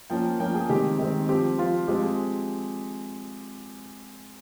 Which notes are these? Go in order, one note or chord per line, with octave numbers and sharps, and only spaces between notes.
F3 A#3 C#4 G5
F3 A#3 C#4 G5
G#4
D#3 G#3 C4 G4
D#3 G#3 C4
F3 C4 G4
F3 C4 F4
F3 G#3 C4 G4
G#4